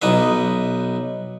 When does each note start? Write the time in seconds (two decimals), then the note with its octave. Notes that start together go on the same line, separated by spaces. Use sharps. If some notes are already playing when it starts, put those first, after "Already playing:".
0.02 B1 D#4 B4 E5